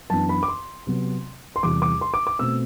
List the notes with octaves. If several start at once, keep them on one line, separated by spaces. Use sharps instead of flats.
F#2 E3 B3 D4 A5
B5
D6
C6
C3 F#3 B3
C6
E2 C3 G3 D6
D6
C6
D6
D6
B2 A3 C4 E6